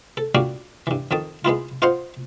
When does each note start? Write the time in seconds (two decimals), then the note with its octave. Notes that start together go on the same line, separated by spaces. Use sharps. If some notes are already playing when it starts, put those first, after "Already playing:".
0.17 A4
0.35 A#2 G3 D4 F#4 F5
0.87 G2 E3
1.11 F2 D#3 A5 D#6
1.45 G#3 B3 E4 F4
1.82 F4 C5 D#5 F5 F#5 C6